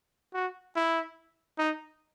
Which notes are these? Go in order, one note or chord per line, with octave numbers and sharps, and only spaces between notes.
F#4
E4
D#4